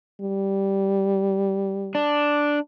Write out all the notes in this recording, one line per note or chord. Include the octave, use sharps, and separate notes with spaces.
G3
D4